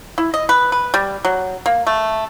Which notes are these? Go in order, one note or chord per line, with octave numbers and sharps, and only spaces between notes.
E4
D#5
B4
B4
G3
F#3
A#3
A3